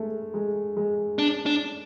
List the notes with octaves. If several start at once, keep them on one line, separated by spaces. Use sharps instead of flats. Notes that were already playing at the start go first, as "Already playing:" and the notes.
Already playing: G#3 A3
G#3
G#3
D4
D4